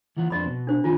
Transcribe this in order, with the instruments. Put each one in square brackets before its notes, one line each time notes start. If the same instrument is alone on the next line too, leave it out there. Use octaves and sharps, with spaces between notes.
[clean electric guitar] E3 F4 F#5
[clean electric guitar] F2 D4 C5 [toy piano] D#5 B5
[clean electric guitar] B2
[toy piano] D4 C5
[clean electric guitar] A#2 D#3 G#5 [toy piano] F4